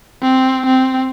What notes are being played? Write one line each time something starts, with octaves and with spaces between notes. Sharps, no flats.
C4
C4